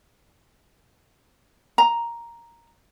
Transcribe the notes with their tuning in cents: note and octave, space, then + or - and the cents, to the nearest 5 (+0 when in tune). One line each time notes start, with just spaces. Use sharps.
A#5 +5